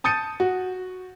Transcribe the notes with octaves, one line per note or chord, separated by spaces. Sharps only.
A5 D#6 G6 A6 C#7 D#7
F#4